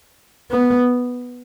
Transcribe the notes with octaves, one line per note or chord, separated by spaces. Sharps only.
B3